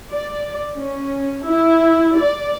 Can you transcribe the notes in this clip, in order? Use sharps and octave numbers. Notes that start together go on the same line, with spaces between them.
D5
C#4
E4
D5